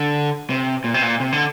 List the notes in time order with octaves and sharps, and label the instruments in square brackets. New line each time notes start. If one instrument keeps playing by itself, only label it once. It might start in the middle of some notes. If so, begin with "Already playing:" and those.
Already playing: [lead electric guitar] D3
C3
A#2
C3
A#2
C3
D3